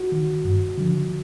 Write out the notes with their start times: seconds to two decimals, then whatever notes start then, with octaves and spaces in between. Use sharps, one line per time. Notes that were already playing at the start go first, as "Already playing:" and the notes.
Already playing: F#4
0.12 D#3
0.45 G2
0.78 D3 F3